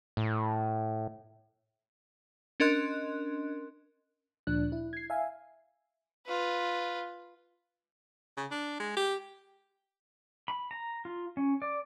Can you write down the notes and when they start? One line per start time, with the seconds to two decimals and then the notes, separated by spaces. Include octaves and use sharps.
0.17 A2
2.60 C#4 D4 A#4 D#5 C6 F#6
4.47 D2 A#2 F3 D4 F#6
4.72 E4
4.93 G#6 C7
5.10 E5 F5 G#5
6.26 F4 B4
8.37 C#3
8.51 D4
8.80 G#3
8.97 G4
10.48 B5
10.71 A#5
11.05 F4
11.37 C#4
11.62 D5